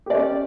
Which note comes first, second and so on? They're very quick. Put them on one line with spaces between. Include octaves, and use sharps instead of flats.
G4 D5 C#4